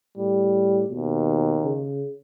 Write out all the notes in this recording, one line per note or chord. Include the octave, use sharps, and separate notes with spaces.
A2 G3
D#2 B2
C#3